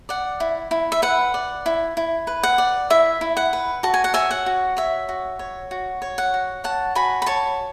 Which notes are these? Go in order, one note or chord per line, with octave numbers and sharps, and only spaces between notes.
D5 F#5
E4
E4
E5
B4 F#5
D5
E4
E4
B4
F#5
D5
E4 E5
E4
F#5
B4
F#4 A5
G#5
F#5
C#5 E5 G#5
F#5
F#4
C#5 E5
F#4
C#5
F#4
C#5
F#5
F#4
C#5 F#5 A5
F#4 G#5 B5
B5
C#5 A5 C#6